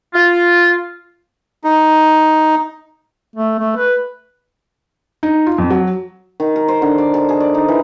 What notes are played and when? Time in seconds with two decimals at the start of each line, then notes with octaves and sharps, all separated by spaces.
0.14 F4
1.64 D#4
3.36 A3
3.59 A3
3.77 B4
5.23 D#4
5.46 F4
5.58 F2
5.70 F#3
6.40 D#3
6.56 A#4
6.68 C5
6.82 D3
6.98 D5
7.14 A4
7.29 G#4
7.40 D5
7.54 D#4
7.68 E3